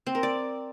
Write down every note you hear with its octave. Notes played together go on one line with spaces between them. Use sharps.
C4
A#4
D5